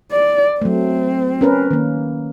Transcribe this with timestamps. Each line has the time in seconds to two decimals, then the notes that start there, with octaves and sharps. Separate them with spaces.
0.12 D5
0.62 F#3 A3 C4
1.41 C#4 A#4 B4
1.71 D#3 A#3